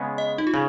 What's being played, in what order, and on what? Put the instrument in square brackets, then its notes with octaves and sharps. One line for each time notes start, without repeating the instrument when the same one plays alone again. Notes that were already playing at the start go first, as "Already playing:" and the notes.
Already playing: [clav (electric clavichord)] C#3 G#3 B3
[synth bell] D#5
D#4
F4
[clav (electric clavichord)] C#3